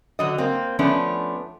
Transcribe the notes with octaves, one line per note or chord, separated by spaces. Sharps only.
D3 F#3 D#5
A#3 C4
F3 A3 B3 C#4 D4